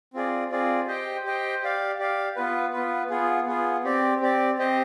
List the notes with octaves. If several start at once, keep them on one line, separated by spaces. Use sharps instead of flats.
C4 F4 G#4 D5
C4 F4 G#4 D5
G4 C5 D#5 G5
G4 C5 D#5 G5
G4 D5 F5
G4 D5 F5
B3 F4 B4
B3 F4 B4
B3 F4 G#4
B3 F4 G#4
C4 G4 D5
C4 G4 D5
C4 G4 C5 D#5